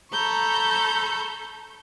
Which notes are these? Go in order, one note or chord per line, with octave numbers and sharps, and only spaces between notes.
A4 A#5 B5 C#6 G6